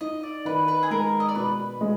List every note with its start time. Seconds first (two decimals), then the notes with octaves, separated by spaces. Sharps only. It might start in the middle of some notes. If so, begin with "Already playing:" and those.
0.01 D#4 D#5
0.23 D5
0.45 D#3 B4
0.68 B4
0.83 G#4
0.91 G#3 A#4
1.20 D#5
1.29 D5
1.35 B2 B4
1.81 G#3